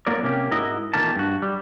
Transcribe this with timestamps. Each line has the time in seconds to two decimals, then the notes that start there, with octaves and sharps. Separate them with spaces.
0.07 A2 F#3 A#3 A#4 D5
0.23 C3 A#3 C#4 G4
0.51 G#2 E4 F#4 A#4 D#5
0.94 E2 A#2 D#3 A3 A#3 A5
1.16 G2 F#4
1.42 G3